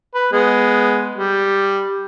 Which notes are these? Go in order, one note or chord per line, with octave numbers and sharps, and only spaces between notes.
B4
G#3 B3
G3